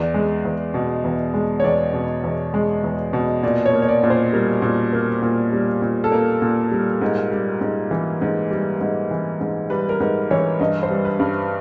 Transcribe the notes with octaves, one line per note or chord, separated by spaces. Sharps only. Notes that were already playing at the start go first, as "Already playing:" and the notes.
Already playing: E2 D5
G#3
E2
B2
E2
G#3
C#5
E2 D5
B2
E2
G#3
E2
B2
A#2 D5
C#5
A#3
C#5
D5
A#2
C5
G3 A#4
A#2
A#3
A#2
G3
A#2
A4
A#3 A#4
A#2
G3
G#2
G3
G#2
E3
G#2
G3
G#2
E3
G#2
G3 B4
A#4
G#2 B4
E3 C#5
G2 D#5
C5
G3
B4
G2